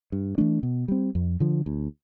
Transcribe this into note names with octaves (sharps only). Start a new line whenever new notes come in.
G2
E3 A3 D4
B2
G3 C4
F2
D3 F3
D2